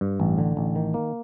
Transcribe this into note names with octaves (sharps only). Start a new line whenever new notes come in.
G2
A1
D3
A1
D#3
A#3